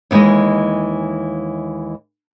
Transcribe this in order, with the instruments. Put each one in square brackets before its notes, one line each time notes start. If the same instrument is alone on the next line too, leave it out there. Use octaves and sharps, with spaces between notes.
[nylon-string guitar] D#2 D#3 E3 G#3 D#5